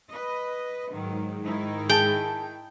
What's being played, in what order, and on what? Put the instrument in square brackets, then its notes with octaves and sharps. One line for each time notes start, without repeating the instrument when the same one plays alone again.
[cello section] B4 D#5
[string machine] G#2 [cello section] D#3 F#3
[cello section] D#3 D#4 E4
[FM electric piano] G#4 A5 [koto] G5